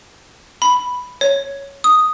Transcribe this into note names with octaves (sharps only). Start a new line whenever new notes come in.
B5
C#5
D#6